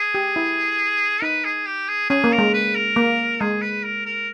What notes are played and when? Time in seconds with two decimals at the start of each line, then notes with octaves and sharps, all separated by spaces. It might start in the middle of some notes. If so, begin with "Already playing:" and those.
Already playing: G#4
0.15 G4
0.36 E4
1.22 D#4 B4
1.45 G#4
1.66 G4
1.88 G#4
2.10 C#4 G#4
2.24 A#3
2.32 A#4
2.38 G#3
2.54 B4
2.76 A#4
2.96 A#3
3.40 G#3 G#4
3.62 B4
3.84 A#4
4.05 A#4